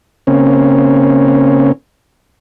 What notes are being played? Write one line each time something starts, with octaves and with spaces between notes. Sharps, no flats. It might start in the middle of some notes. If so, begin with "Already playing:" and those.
C#3 A#3 C4 C#4